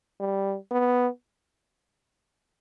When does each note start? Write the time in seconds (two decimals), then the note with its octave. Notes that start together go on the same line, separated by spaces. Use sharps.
0.20 G3
0.71 B3